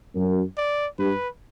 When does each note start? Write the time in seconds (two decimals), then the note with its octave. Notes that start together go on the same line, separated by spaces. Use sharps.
0.15 F#2
0.57 D5
0.99 G2 B4